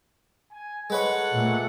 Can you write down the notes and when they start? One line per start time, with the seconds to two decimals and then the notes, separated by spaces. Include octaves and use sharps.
0.51 G#5
0.90 G#3 A4 B4 C#5 F#5
1.34 A#2 A3